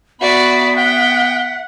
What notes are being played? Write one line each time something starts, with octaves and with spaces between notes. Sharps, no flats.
B3 F#4 D5 E5 B5
F#5 G5